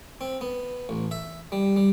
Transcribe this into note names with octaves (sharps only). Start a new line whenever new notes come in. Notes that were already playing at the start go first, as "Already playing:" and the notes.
C4
B3
A1
E5
G3
G3